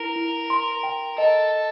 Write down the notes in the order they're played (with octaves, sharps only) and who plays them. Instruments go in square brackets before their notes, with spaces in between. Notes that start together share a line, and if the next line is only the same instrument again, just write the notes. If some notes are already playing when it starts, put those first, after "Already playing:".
Already playing: [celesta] E4 [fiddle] A#4
[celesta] E4
C6
G5
[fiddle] A4 [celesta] D#5
[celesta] D#5